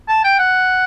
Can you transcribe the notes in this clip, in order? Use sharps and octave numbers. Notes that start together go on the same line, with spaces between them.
A5
G5
F#5